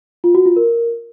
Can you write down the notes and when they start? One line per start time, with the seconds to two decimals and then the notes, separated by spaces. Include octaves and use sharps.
0.24 F4
0.35 F#4
0.46 F4
0.56 A#4